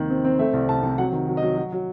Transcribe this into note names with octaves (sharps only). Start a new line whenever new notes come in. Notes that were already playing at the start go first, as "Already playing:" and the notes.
Already playing: D#2 C3 D#3
C4
C4
A3 E5
C2
C2 A5
C3
F#3 F#5
D#3
F#3
D#5
F#3
F#3
F#3